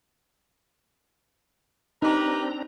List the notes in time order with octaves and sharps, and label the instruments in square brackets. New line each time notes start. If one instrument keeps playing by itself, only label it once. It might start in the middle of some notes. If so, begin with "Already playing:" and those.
[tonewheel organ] C4 D4 A#5 [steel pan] D#4 [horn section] G4 A#4 B4